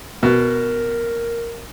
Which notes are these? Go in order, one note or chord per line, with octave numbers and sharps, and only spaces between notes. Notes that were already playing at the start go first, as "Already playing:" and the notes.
B2 A#4